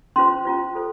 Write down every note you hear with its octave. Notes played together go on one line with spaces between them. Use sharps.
C#4 F4 C5 C6
C#4 F4 C5
F4 A4 C5